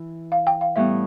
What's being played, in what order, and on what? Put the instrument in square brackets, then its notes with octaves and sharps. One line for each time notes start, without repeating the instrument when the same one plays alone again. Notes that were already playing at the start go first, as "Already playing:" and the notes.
Already playing: [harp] E3 E4
[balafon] F5
G5
F5
[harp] A2 G3 B3 [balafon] E5